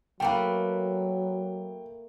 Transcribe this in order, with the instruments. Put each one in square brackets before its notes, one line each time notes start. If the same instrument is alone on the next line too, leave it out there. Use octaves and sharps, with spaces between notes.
[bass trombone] F#3 [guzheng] A3 A#3 B4 [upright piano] G5